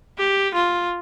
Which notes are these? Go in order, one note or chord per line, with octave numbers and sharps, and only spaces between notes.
G4
F4